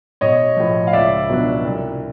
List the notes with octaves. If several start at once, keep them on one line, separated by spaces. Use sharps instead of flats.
B1 C#5 D#5
A2 F3
F5
C#2 D5 E5
B2 F#3 B3 D4
C2